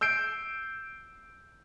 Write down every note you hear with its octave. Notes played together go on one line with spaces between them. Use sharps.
E6 G6 C7 D7